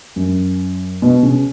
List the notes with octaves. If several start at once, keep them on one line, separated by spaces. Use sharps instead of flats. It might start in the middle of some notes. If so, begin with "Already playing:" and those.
F#2
B2
C#3